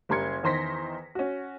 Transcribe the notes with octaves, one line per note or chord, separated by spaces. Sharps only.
F#1 G3 A#4 C6 G#6 C#7
E2 D#3 C5 C6 A#6 B6
C#4 F#4